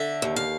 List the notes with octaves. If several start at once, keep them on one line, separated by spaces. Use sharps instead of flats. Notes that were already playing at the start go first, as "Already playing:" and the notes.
Already playing: D3 E5
D#2
F5